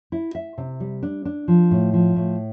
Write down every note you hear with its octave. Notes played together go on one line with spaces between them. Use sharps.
E4
E5
C3
G3
D4
D4
F3
A2
F3
A2